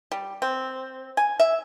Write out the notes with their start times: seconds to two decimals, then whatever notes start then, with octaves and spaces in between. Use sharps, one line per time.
0.12 G3
0.42 C4
1.17 G#5
1.40 E5